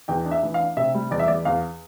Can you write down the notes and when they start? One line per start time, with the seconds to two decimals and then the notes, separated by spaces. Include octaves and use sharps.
0.08 E2 G5
0.25 D4
0.31 E5
0.43 E3
0.54 F5
0.60 D4
0.77 C3 E5
0.95 G3
1.11 E2 D5
1.19 E5
1.28 E2 D5
1.45 E2 F5